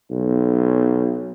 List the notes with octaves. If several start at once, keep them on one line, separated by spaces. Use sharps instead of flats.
B1